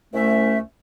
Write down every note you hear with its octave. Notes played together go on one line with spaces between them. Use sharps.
C2 A3 C#4 E5